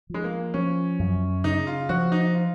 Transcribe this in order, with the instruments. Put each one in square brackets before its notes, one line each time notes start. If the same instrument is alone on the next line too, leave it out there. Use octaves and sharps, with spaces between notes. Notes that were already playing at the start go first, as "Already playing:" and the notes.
[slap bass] F3 [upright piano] G#3
[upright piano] A#3
[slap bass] F3 [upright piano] C#4
[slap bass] F#2
[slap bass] C#3 [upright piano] D#4
[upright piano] F4
[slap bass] F3 [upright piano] F#4
[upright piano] D#4
F4